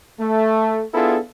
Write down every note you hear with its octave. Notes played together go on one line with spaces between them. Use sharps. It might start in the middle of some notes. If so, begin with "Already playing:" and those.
A3
B3 D4 E4 F4 G#4 A4